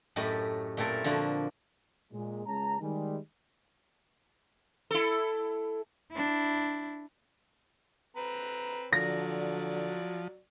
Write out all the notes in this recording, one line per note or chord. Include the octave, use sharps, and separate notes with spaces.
F#2 A2 A3 G4 D#5 B5
A#2 A3 C4 E4 A4 A#4
D3 F3 A#3 F#4
A#2 G#3
C#2 G#3 C#4 A5 A#5
D#3 G3 G#3
E4 A4
D4 E4
C4 B4 A#5
D3 F3 F#3 D5 A#6